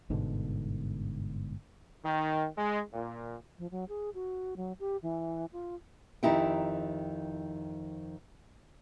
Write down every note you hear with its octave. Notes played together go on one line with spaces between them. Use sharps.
G1 G#2 B2 D3
D#3
G#3
A#2
F3
F#3
G#4
F#4
F#3
G4
E3
F4
F2 D#3 D#4 E4 G4 G5